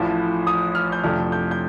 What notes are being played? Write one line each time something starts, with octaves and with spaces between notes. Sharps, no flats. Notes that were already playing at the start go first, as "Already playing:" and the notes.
Already playing: A1 A2 F3
D#6
F6
G6
F2 C3 F3 A3 D4 F6
G6
G6